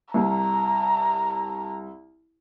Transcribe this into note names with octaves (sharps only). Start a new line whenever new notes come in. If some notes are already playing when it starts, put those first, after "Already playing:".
C2 A#5